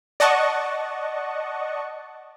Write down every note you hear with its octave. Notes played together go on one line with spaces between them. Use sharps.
D5 D#5 F#5 A5 C#6